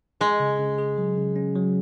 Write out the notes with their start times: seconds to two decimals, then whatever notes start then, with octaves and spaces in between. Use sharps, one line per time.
0.21 G#3 G#4
0.40 C#3
0.59 C#3
0.78 G#4
0.98 F#3
1.17 C#3
1.36 C#4
1.56 F#3